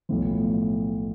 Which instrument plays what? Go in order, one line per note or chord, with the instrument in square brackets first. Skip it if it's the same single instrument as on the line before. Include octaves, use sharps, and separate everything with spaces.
[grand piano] B1 A2 F3